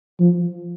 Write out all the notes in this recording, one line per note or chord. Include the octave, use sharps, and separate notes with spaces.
F3